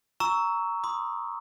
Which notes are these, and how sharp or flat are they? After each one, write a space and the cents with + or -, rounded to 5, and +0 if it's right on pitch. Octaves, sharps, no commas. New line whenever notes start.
A#5 +0 C#6 +20 E6 -5
C6 -40 D#6 +0